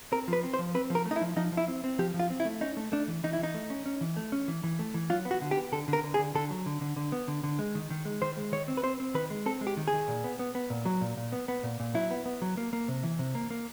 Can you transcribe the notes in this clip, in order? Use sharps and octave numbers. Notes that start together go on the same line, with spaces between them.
C4 A#4
F3 B4
C4
C5
F3
C4 B4
F3
A#4
A3
D#4
E4
F3
F3 D#4
F3
E4
C4
C4
F3 G4
F3
F4
C4
E4
A3
C#4 D#4
A3
A3 D4
E3
E3 D#4
E4
E3 D#4
A3
C#4
C#4
E3
A3
C#4
E3
E3
A3
E3
F#3 F4
B3
F#4
D3
G4
B3
D3 A4
D3
A#4
D3
G#4
D3
D3 A4
F#3
D3
D3
D3
B3
D3
D3
G#3
D#3
D#3
G#3
D#3 C5
G#3
D#3 C#5
C4
B4
C4 C5
C4
D#3 B4
G#3
C4 A4
G#3
G4
D#3
G#4
D#3
A#2
B3
B3
B3
A#2
F#3
A#2
A#2
B3
B3
A#2
A#2
F#3 E4
B3
B3
F#3
A#3
A#3
C3
E3
C3
A#3
A#3